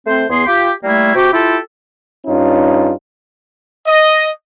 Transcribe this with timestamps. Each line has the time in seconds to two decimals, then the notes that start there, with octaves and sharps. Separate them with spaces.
0.07 A3 C4 C5
0.29 E2 B3 G#4 C6
0.46 F4 G4
0.84 G3 A3 A#3 E4
1.14 C3 F#4 G4
1.33 E4 F4 G4 A4
2.27 G2 C#4 D#4 F4
3.87 D#5